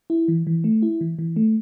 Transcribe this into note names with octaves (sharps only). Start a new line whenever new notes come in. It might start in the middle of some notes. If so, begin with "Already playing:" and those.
E4
E3
E3
A3
E4
E3
E3
A3